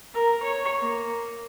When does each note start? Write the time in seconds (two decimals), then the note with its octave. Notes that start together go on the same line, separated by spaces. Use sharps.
0.14 A#4
0.43 C#5
0.80 A#3